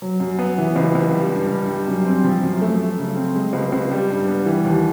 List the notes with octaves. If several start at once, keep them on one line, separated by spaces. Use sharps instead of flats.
F#3
F#2
B3
E3
C#2
C#2
G3
G2
G2
G3
F#2
C4
F3
F#2
A3
A3
C#3
C4
G#3
C#2
C#2
G3
G2
B3
E3
D#2